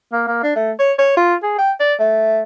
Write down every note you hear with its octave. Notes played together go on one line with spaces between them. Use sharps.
A#3
A#3
D4
A3
C#5
C#5
F4
G#4
G5
D5
A3